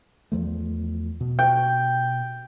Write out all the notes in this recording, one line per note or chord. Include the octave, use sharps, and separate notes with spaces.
E2 F3 A3
B2
G5